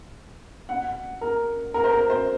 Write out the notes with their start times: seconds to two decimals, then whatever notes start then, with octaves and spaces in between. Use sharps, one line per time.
0.69 F#5
1.21 A#4
1.74 A#4
1.84 C5
1.92 A#4
2.10 C5